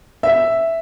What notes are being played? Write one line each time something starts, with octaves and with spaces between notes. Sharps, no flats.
E5